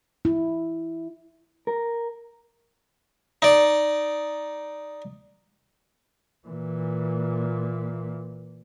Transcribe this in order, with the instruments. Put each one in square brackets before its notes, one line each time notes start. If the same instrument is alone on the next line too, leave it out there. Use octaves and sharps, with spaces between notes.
[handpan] E4
[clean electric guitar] A#4
[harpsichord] D#4 D5
[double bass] A#2 E3